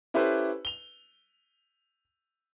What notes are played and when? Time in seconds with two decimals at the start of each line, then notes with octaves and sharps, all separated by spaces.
0.14 C#4 E4 G4 A4 B4 C5
0.65 F7 G7